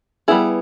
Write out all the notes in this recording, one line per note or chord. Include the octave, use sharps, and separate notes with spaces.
G3 B3 E4 G#4